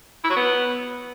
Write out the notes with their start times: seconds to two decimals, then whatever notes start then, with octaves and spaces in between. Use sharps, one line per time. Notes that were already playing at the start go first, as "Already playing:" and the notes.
0.24 E4
0.30 F#3
0.36 B3